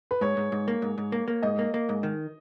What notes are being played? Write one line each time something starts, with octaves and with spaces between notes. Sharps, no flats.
B4
G#2 C#5
G#2
G#2
A#3
G#2
G#2
A#3
A#3
G#2 D#5
A#3
A#3
G#2
D#3